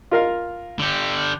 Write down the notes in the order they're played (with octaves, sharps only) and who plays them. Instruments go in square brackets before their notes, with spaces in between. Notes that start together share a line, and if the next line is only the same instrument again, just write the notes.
[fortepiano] F4 A#4 F5
[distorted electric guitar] D3 G4